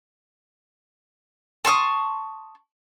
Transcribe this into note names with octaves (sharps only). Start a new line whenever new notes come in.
A5 C6 C#6 D#6